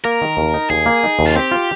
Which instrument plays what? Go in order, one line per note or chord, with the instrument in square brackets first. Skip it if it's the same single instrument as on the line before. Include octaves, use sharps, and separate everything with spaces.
[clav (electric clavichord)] A#3 [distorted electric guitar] A#4
[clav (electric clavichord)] D#3
D#2
D#4
[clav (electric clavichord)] D#2 [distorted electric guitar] G#4
[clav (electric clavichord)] A#3
D#4
D#2
[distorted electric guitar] F4
[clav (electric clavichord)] C4 [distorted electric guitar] G4
[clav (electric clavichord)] F4